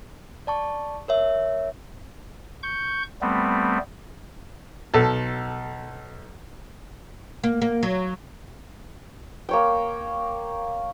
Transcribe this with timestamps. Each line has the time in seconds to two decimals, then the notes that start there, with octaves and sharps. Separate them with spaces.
0.47 D5 A5 C#6
1.08 A#4 C#5 E5
2.63 C#6 G6
3.22 G3 A3 B3 C4
4.94 B1 A4
7.44 A#3
7.62 A#3
7.83 F#3
9.49 A#3 C#5 G5